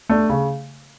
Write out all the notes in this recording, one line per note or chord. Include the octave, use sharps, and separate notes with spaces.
A3 D4
C#3